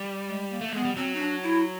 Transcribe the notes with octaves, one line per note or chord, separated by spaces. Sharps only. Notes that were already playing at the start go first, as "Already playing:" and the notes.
Already playing: G3
G#3
A#3
A3
A#3
G#3 B3
G3
F#3 C4
D#4
D4
E4